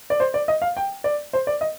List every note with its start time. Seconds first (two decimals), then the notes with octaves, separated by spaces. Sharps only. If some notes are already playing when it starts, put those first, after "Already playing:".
0.10 D5
0.20 C5
0.34 D5
0.48 D#5
0.62 F5
0.77 G5
1.04 D5
1.33 C5
1.47 D5
1.61 D#5